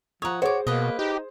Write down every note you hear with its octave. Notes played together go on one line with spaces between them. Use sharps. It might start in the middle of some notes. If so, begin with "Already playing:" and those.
F3 C#5 F#5 A#5 D#6
F#4 G#4 C5 C#5 D6
B2 A#3 B4 D#5
D#4 G4